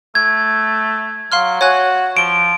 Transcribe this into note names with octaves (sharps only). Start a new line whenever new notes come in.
A3 G#6
F#3 F5 C6 F6
F#4 C#5 G#5 F#6
F3 D7 E7 G7